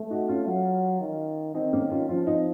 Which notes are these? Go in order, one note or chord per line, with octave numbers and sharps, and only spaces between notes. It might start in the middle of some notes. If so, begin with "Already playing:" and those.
Already playing: A3
D#4 F#4
C#4 F4
F#3
D#3
D#3 C4 D#4
A#3 C#4
C#4 F4
F3 C#4 F4
C4 D#4